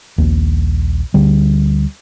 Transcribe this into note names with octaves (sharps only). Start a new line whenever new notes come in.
A#1 D#2
D2 D3 G3